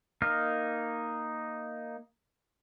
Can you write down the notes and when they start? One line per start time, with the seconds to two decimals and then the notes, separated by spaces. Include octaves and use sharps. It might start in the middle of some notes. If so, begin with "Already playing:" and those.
0.22 A#3 D#4 F6